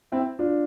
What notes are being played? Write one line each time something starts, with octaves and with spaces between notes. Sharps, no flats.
C4 E4
D4 F4